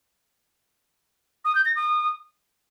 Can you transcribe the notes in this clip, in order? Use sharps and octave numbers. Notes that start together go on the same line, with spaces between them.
D#6
G6
A#6
D#6